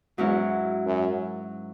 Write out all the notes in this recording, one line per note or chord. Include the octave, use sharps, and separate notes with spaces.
E2 G#2 F#3 C#4 E4
F#2